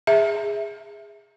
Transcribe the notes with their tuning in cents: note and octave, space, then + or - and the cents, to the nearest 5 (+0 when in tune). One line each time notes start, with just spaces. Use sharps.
G#4 -15 E5 +0